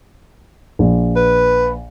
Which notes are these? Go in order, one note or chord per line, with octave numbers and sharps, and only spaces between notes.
A#1
B4